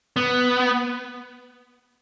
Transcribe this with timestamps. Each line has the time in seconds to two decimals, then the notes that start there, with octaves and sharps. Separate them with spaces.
0.16 B3